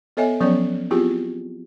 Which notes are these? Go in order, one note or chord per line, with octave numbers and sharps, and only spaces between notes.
B3 A4 C#5 D#5 E5 G#5
F3 F#3 B3 C#4 C#5 D5
B3 C4 E4 F4 G4 G#4